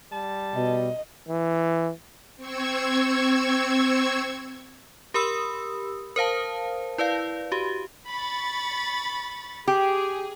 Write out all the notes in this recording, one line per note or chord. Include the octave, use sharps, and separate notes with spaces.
G3 A5
B2 D#5
E3
C4 C#6 E6 G#6
G4 A#4 B5 D#6 E6
A#4 C5 F5 A5
E4 B4 D5 F5
F#4 G4
B5 C#6 A6
G4 G#4